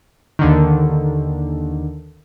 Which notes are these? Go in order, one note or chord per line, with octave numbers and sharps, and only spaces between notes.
D#2 D3 D#3